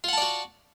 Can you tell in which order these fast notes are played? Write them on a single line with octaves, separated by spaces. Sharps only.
F4 F#5 A5 D5 F#4